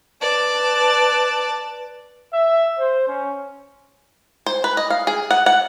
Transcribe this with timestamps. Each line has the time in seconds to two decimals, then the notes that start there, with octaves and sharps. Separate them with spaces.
0.21 B4 D5 A5
2.33 E5
2.79 C5
3.08 C#4
4.46 C5
4.64 B4
4.77 D#5
4.90 F5
5.07 G#4
5.31 F#5
5.46 F#5